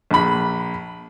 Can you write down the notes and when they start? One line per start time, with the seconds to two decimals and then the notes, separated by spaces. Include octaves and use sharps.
0.11 A#1 B5